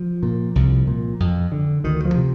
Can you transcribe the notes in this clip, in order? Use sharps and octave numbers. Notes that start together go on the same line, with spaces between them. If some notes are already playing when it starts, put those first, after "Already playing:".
Already playing: F3
A#2
C2
A#2
F2
D3
D2 D#3
F3
C3